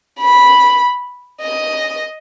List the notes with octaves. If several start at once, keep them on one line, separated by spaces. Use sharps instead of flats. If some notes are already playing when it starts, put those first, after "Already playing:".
B5
D#5